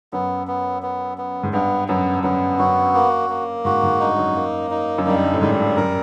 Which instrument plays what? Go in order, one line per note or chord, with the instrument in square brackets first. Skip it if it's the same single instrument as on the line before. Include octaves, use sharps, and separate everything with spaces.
[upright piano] F#2 [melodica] B3
[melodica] B3
B3
B3
[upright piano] G#2
[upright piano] G2 [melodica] B3
[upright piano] F#2 [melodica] B3
[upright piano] F#2 [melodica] B3
[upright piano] F#2 [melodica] F#4
[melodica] A#3
A#3
[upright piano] G#2 [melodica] F#4
[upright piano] G#2
[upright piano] G2 [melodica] D#4
[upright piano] F#2
[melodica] A#3
D#4
[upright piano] F#2
[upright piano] G2 [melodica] G3
[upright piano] G2
A2
[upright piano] G#2 [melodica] G3
[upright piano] G2
[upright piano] F#2 [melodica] A#4